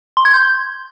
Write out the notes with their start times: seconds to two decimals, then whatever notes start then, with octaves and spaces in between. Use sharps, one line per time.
0.17 C6
0.25 G#6
0.34 G6